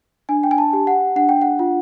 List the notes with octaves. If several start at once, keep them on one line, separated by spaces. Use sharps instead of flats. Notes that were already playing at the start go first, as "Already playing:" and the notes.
D4 G#5
G5
G#5
A5
G4
F#5
D4 F#5
G5
F#5
F4